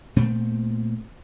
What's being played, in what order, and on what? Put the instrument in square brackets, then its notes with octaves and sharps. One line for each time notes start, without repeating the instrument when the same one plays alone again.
[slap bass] A#2 A3 C4